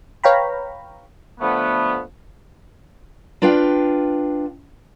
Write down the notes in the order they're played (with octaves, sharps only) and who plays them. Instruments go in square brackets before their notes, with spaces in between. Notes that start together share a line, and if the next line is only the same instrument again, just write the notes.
[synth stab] B4 C#5 F5 G5 A#5 B5
[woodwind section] D3 F3 A3 B3
[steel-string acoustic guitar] D4 F4 B4 F5 G5